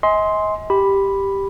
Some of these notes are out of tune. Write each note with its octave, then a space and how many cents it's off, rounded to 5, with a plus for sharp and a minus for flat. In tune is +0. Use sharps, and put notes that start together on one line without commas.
D#5 +35 G#5 +0 C6 +0
G4 +0 B5 +0